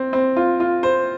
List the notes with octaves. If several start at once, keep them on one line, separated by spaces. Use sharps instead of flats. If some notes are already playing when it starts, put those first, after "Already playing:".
Already playing: C4
C4
F4
F4
C5